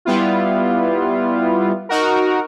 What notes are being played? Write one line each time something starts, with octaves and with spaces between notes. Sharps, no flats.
G3 B3 E4 F4
D#4 F#4 A#4